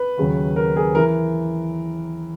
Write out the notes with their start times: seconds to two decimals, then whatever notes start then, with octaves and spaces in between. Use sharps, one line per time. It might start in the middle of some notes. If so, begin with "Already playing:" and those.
Already playing: B4
0.18 D#2 C#3 F#3
0.56 A#4
0.76 G#4
0.95 E3 A#4